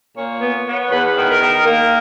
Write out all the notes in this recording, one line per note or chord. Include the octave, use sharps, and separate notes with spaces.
A#2 C#5
B3
B3
E2 B4
D#3
A#4
D#3
A#3 A#4